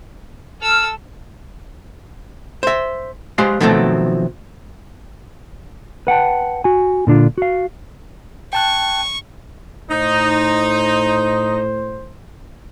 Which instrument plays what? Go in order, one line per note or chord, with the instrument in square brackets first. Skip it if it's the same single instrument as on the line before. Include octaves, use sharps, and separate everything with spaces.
[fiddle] A4 E6 [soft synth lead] F6
[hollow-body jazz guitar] C5 E5
G#3 G4 B4 C5 F5 C6
B2 D#3 F3 F#3 A3 C4
[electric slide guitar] B4 F#5 G5 A5
F#4 G#5
A#2 D3 D4 F4
F#4 F5
[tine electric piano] G5 A5 F#6 [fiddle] C#6
[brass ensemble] A2 C5 [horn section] D#4